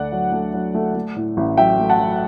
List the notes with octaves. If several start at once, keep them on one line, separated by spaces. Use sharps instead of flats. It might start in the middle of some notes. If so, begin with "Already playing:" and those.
Already playing: D2 A3 D5 F#5
F#3
A3
F#3
A3
A3
A2
A1
F#3 E5 G5
A3
F#5 A5
F#3